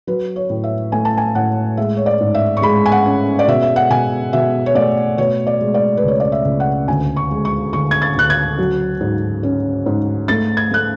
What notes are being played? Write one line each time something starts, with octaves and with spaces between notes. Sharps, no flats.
F#3 B4
C#5
A2
E5
A3 G#5
A5
G#5
A2 F#5
G#3 E5
C#5
D5
G#2
E5
C#6
G#3 B5
G#5
F#5
C#4
D5
B2 E5
E5
F#5
B2 G#5
B2 E5
C#5
A3 D5
B2 C#5
D5
G#3
D5
B4
C#2 C#5
D5
E5
C#2
F#5
D2 G#5
C#6
G#3
C#6
D2 C#6
G#6
A6
D2 F#6
G#6
F#3
G#2
C#4
G#2
A3 A6
G#6
A3 F#6